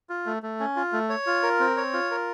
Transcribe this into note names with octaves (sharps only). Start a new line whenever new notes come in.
F4
A3
A3
C#4
F4
A3
C#5
F4
A#4
C4
C#5
F4
A#4